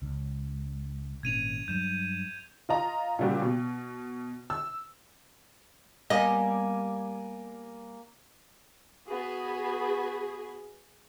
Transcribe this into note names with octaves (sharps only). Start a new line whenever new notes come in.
C#2
G#1 A#2 C#4 G#6 D#7 F7
G2 F#3 G6 E7
F4 D#5 A#5
A#2 C#3 G3 F#4 G4
B2
E6
G3 A#3 B3 D#5 G#5
B3 F#4 G#4